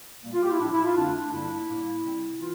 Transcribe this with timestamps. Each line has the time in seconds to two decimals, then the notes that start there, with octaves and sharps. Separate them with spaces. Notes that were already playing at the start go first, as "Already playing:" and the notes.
0.24 A#2 G3 A#3
0.33 F4
0.42 G4
0.52 E4
0.60 A2 F3 C4 D4
0.72 E4
0.84 F4
0.96 F2 D3 A3 C4 D4
1.31 G2 D3 G3 A#3 E4
1.67 A2 G3 A#3
2.03 C3 G3 C4
2.39 E3 F4